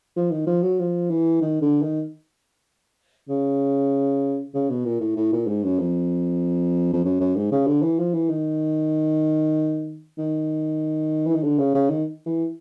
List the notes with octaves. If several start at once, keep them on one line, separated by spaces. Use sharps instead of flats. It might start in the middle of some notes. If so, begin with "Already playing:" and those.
F3
D#3
F3
F#3
F3
E3
D#3
D3
D#3
C#3
C#3
B2
A#2
A2
A2
A#2
G#2
F#2
F2
F2
F#2
F#2
G#2
C#3
D3
E3
F3
E3
D#3
D#3
E3
D#3
D3
C#3
C#3
D#3
E3